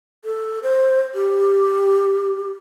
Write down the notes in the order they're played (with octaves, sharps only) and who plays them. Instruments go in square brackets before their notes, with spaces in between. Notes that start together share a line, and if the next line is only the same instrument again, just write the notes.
[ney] A4
C5
G4